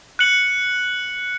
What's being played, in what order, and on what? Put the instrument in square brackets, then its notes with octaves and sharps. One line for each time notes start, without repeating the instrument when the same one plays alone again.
[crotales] F#6 C#7 F#7